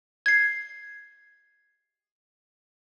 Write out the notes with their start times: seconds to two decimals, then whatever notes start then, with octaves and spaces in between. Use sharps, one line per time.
0.26 G#6 C7